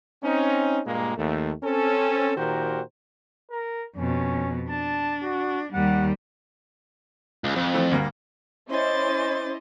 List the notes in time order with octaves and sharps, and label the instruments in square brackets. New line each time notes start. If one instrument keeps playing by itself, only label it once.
[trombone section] C4 C#4 D#4
G2 A#2 G#3 A#3
D#2 A3
C4 C#4 A4
A#2 D#3 F#4 G4 A#4 C5
[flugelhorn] A#4
[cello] F2 B2 [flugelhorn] C#4
[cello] D4 [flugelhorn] A5
[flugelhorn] F#4
[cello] D#2 G3 [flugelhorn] F#5
[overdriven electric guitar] C#2
[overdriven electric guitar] F2 [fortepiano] C4
[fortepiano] E3 A3 C4
D2 G2 A#3
[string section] C#4 E4 D#5 [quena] C5 [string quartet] C6 D6 A6